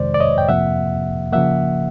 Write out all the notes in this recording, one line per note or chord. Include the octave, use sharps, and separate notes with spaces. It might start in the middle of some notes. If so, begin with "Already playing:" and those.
Already playing: F2 C3 D#3 G#3 C5 D5
D5
C#5 D#5
G5
F2 C3 F3 A#3 E5 F#5
C#3 F3 A#3 E5 F#5